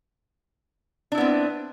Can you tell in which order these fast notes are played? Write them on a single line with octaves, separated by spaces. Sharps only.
D4 E4 B3 C4